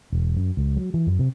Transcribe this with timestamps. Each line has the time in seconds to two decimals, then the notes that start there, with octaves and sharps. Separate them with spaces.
0.12 E1
0.37 F#2
0.57 C#2
0.76 F#3
0.94 E3
1.07 F#2
1.19 C3